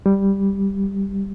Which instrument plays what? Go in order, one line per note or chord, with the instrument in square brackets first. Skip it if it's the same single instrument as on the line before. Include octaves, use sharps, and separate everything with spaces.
[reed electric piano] G3